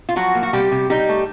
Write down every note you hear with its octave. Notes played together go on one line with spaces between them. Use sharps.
F4
F3 F#3 F#4
A#3
F#4
C3 G3 G4
C3
G3 D#4 G4
A3